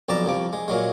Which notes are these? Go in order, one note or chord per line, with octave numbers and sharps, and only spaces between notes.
B1 F2 D5 A5 A#5
C2 F3 D6
G#3
A#2 F#3 G#3